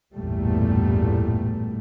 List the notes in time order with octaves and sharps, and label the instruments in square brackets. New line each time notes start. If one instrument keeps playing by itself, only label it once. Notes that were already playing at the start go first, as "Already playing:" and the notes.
[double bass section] A1 E2 G2 A#2 G3 A3